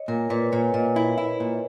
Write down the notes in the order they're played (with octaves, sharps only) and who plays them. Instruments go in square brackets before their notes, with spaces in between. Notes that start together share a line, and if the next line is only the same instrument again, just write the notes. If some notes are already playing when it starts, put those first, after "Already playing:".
Already playing: [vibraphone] C#5 D#5
[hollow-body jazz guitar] A#2 [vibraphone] A#4
[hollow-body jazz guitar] A#2 [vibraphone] B4
[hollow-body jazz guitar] A#2 [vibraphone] C#5
[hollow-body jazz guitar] A#2 [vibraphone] D#5
[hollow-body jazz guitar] E4
E4
A#2